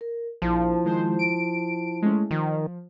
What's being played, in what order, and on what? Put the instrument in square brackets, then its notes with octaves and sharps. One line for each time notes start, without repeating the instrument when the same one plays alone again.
[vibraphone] A#4
[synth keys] A#1 [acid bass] F3 [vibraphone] E4 A5
[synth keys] D#3 G#3 C5
D7
G#3 A3 C#4
[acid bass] D#3 [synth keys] F3